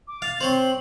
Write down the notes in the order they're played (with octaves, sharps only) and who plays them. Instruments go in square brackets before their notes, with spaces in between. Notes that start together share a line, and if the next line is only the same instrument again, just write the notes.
[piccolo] D6
[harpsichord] F5 [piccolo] A6
[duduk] C4 [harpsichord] C5 C#5 C6 [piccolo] F#7